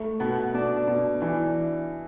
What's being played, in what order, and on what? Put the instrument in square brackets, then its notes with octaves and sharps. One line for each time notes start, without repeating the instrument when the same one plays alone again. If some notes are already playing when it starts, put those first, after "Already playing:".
Already playing: [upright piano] A3
[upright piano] B2 [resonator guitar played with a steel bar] B3
[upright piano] B2 [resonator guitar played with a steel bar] D4
[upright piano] B2
[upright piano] E3 [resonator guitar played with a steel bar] D4